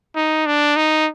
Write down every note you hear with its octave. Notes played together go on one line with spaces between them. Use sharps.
D#4
D4
D#4